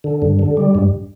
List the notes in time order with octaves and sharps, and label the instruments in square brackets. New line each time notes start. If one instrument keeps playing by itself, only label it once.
[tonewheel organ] D3
G2
D3
G3
G2